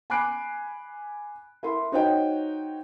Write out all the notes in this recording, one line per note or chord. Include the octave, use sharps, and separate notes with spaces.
G#5 B5 D6 F#6 C7 D7
E4 A#4 C6
D#4 F#4 C5 C#5 D#5 G5